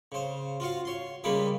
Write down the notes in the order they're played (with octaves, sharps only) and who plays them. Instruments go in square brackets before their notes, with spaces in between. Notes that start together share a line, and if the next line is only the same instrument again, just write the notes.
[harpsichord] C#3 C5
F4 F#4 F5
C#5 C6
C#3 G3 G#3 A#3 B4